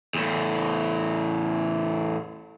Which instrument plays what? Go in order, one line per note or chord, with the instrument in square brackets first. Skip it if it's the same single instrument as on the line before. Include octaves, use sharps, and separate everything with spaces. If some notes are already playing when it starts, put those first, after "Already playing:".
[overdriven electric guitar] E2 A2